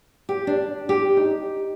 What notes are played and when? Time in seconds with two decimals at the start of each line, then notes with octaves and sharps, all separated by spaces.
0.29 G4
0.47 D4
0.89 G4
1.17 D#4